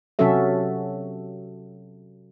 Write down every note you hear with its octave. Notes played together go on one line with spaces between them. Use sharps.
C3 F#3 C#4 F#4 A4 E5